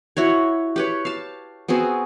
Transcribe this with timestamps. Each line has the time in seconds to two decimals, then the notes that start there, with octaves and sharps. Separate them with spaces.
0.17 E4 F#4 C#5
0.76 G4 B4 C#5
1.05 F5 A5
1.68 B3 C4 F#4 G#4